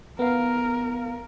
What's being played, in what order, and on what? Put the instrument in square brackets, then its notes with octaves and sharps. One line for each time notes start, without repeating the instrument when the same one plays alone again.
[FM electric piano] B3 F5 [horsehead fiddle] A#4